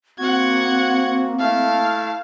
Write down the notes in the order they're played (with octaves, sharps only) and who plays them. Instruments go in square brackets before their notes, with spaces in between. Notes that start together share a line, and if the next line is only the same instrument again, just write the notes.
[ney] A#3 [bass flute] C4 [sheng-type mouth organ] F#4 [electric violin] F#5 G#6
[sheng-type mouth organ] A3 E4 A5 [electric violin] F5